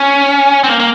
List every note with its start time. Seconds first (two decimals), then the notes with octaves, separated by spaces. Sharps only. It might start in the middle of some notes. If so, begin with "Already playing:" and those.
Already playing: C#4
0.64 C4
0.69 A#3
0.80 A#3